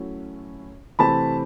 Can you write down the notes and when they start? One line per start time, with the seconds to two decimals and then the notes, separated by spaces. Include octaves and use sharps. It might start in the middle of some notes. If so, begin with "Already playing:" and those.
Already playing: F#3 A3 C#4 E4
0.99 C3 E3 A3 C4 A5 B5